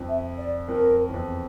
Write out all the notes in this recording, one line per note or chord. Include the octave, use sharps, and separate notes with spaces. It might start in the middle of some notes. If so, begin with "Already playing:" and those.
Already playing: F2
E5
D5
F2 A#4
E2
F2